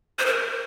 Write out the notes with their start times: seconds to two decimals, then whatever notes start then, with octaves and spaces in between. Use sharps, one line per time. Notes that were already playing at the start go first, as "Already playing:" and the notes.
0.19 C5
0.26 A#4